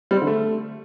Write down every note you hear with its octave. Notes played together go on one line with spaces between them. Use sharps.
G3
C4
D3
A3